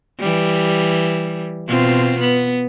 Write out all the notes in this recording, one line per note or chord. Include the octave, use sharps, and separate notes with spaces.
E3 G3
B2 C4 F4
B3